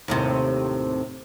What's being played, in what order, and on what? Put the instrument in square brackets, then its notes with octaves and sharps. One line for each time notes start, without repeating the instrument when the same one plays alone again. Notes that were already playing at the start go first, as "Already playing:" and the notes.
[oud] D#2 A2 C3